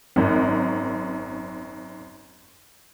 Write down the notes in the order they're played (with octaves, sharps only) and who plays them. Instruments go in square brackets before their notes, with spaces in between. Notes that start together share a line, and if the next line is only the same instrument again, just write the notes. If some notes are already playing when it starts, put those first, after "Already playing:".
[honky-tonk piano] G#1 F#2